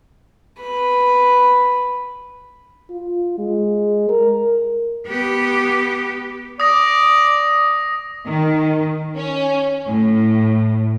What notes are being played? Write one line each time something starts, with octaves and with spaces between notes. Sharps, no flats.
B4 B5
F4
G#3
A#4
B3 G4
D5 D#6 A#6
D#3
C#4
A2